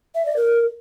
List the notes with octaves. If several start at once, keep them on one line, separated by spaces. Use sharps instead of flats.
E5
D5
A#4